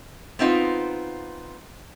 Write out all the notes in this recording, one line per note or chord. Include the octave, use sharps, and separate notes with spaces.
B3 C4 D#4 F4